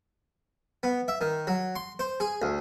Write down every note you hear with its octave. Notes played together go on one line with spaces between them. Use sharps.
B3
E5
D#3
F#3
C6
C5
G#4
D2